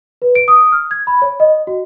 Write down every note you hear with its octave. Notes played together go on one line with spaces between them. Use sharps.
B4
D7
D#6
F6
G#6
B5
C#5
D#5
F#4